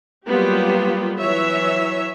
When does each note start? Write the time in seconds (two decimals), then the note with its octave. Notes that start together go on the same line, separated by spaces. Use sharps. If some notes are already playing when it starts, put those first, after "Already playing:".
0.27 F#3 G3 A#3 B3 F4 G4
1.18 E3 F#3 C#5 E5